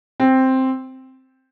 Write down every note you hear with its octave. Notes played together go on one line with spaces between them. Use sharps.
C4